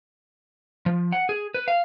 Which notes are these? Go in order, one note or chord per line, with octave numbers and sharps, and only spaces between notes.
F3
F#5
G#4
B4
F5